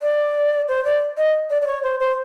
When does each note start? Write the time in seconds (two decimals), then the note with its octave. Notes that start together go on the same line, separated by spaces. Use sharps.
0.02 D5
0.68 C5
0.85 D5
1.17 D#5
1.50 D5
1.62 D5
1.67 C#5
1.83 C5
2.00 C5